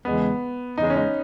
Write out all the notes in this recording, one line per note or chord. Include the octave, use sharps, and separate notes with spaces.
E2 C#3 G#3 B3
E2 C#3 G#3 D#4
C#4
D#4